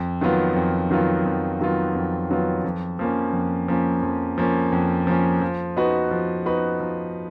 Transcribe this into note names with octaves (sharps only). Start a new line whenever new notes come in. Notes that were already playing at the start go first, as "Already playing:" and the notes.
Already playing: F2
D#3 F#3 B3 F4
F2
D#3 F#3 B3 F4
F2
D#3 F#3 B3 F4
F2
D#3 F#3 B3 F4
F2
F3 A#3 C#4
F2
F3 A#3 C#4
F2
F3 A#3 C#4
F2
F3 A#3 C#4
F3
B3 D#4 F#4 B4
F3
B3 D#4 F#4 B4
F3